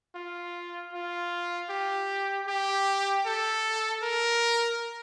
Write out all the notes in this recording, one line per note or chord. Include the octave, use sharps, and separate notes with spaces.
F4
F4
G4
G4
A4
A#4